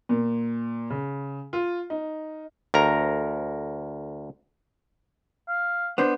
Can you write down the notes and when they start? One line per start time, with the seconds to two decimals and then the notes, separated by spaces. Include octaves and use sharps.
0.09 A#2
0.90 C#3
1.53 F4
1.90 D#4
2.74 D2 A#4 A#5
5.48 F5
5.98 B3 D4 C5